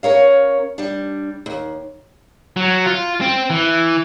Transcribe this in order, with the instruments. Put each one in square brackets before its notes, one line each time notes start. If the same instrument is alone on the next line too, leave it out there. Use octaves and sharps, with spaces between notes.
[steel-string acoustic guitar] C#4 A#4 C#5 F5
G3 D4
D#2
[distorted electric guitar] F#3
F4
C4
E3